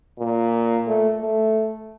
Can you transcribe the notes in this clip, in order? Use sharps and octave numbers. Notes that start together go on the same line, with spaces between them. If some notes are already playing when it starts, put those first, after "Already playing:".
A#2
A3
A3